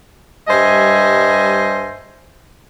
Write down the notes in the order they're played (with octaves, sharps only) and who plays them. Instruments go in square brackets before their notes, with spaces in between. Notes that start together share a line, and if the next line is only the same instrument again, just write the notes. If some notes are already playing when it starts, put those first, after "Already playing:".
[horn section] G2 G3 C5 D#5 E5 G#5